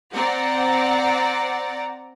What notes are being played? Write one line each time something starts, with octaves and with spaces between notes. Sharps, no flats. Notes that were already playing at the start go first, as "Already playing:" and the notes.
C4 D5 F#5 A#5